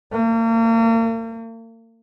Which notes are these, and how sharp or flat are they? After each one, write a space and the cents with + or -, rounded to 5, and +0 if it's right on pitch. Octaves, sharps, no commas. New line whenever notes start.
A#3 -40